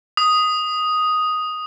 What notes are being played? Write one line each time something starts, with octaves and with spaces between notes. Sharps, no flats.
D#6